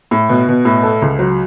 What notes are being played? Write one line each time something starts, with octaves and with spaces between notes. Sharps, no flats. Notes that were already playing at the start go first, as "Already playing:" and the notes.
A2
B2
B2
A2
A4
C#2
F#3